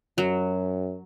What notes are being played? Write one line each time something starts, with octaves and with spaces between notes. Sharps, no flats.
F#2 F#3